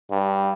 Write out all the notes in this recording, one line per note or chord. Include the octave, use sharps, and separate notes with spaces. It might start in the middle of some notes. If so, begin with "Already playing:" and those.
G2